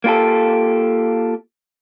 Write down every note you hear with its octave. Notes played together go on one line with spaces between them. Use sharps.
A#3 F4 G4 A4